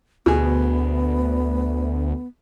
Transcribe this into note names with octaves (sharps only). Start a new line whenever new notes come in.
D2 B2 B3 G#4